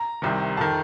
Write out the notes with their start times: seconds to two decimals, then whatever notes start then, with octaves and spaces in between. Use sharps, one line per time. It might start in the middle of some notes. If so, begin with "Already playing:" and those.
Already playing: A#5
0.22 C2 C3 D#3
0.57 F2 D#3 A5